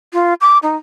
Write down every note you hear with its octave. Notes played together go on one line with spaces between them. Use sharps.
F4
D6
D#4